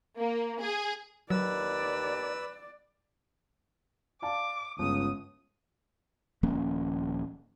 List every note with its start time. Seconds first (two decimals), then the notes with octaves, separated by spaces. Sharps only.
0.17 A#3
0.60 G#4
1.30 D#2 F#3 B4 D5 E6
4.22 D5 F5 A5 D6
4.79 G1 C#2 D#6
6.43 D#1 F3 A#3 C#4